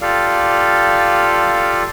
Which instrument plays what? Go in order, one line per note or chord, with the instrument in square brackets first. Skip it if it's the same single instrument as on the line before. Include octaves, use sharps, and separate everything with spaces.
[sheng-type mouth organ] F4 G4 A4 D5 F5